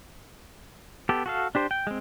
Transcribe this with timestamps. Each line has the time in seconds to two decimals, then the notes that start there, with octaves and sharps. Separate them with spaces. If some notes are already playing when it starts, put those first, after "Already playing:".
1.09 B3 G4 A4
1.26 F#4 A4 F5
1.55 D4 G4 C5
1.71 G5
1.87 G#3 C4